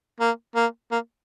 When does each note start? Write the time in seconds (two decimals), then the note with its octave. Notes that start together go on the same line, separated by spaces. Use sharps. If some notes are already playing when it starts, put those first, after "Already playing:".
0.20 A#3
0.55 A#3
0.91 A#3